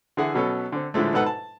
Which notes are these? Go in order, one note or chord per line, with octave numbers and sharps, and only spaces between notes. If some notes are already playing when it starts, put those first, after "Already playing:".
D3 E3 G#4 E5 F#5
B2 F#3 B3 C#4 A4
D3 C4
A2 D3 F3 G#3 A3
G#2 B2 D#4 A4 B4 F#5
A5